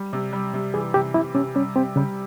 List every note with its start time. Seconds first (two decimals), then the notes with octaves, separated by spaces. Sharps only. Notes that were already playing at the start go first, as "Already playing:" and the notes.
Already playing: G3
0.13 C3
0.32 G3
0.54 C3
0.74 E3 G#4
0.94 C3 G4
1.14 C3 E4
1.34 C3 C#4
1.55 G3 C#4
1.76 C4 G4
1.96 C#3 G3